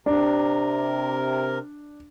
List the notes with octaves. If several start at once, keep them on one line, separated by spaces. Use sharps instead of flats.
C3 D4 A#4